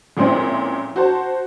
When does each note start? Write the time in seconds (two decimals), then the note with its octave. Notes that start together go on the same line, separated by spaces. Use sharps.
0.17 F2 A#2 G#3 C4 C#4 E4
0.96 F#4 C5 A5